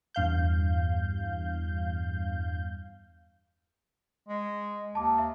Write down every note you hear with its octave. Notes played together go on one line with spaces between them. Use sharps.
E2 G2 F5 G6
G#3
D#2 A5 D6
E5